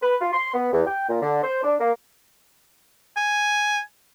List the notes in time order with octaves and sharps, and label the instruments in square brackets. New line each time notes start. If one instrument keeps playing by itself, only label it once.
[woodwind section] B4
F4
C6
B3
E2
G5
A#2
D3
C5
D4
A#3
[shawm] G#5